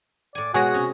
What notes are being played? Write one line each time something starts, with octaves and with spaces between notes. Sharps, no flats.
A2 D5 G#5
B2 G#3 F#4 G#4 C#5 F#5 A#6
C3 C#4